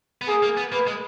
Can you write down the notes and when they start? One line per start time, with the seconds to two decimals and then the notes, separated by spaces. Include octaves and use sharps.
0.22 B3
0.28 A#3 G#4
0.43 A#3
0.57 B3
0.72 A#3 B4
0.87 G#3